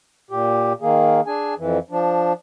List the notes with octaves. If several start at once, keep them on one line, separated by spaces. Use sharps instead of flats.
A#2 G4
D#3 A#3 G#4
D4 G#4 G#5
F2 E3
F3 D4